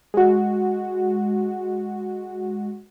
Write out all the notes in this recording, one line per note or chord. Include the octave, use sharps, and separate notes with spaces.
G#3 F#4